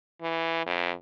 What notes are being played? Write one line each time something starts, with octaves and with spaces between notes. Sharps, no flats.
E3
F2